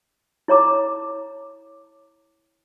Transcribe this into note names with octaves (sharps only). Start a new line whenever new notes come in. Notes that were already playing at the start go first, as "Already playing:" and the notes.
E4 C#5 A#5 D6